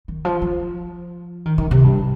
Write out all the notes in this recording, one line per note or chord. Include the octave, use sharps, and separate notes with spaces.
D#3
F3
F3
D#3
D#3
C3
G2